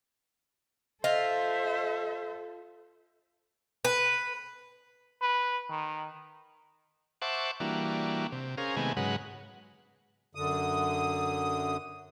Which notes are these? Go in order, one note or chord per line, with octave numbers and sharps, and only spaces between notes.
F4 A4 C5 D#5 E5
B4
B4
D#3
C5 E5 F#5 A5 C#6 D6
E3 G3 A#3 D4 F#4
C3
C#4 G#4 A#4 C5 F5
C3 D#3 G#3 A3 B3 G#5
G#2 C#3 F#3 G#3 B4 F#5
F#2 D3 D#6